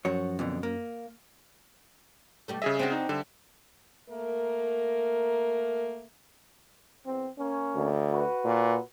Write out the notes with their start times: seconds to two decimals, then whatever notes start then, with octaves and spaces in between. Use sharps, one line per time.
0.05 F#2 F3 F#4 C#5
0.39 F2 B2 D3
0.63 A#3
2.48 B2 G3 A3
2.62 C#3 G#4 D#5 E5
2.79 C4 D4 F#4
2.92 D#4
3.09 D3 G3 E5
4.10 A3 A#3 A#4
7.06 E2 C4
7.37 A#3 C#4
7.75 D2
8.12 F#4 B4
8.44 A#2